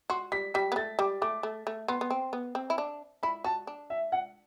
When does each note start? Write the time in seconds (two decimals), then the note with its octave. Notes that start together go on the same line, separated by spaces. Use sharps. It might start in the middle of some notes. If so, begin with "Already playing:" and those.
0.10 F#4 C6
0.32 G3 B6
0.54 G3 B6
0.72 B3
0.76 A3 A6
0.99 G3 D6
1.22 A3 D6
1.43 A3
1.67 A3
1.88 B3 C6
2.01 B3
2.10 C4
2.33 B3
2.55 C4
2.70 E4
2.78 D4
3.23 E4 B5
3.44 F#4 A5
3.67 D4
3.90 E5
4.12 F#5